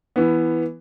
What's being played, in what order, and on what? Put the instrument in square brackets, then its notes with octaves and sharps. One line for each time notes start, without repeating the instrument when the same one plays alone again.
[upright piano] E3 B3